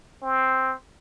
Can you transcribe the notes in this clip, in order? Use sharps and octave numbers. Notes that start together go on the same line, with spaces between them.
C4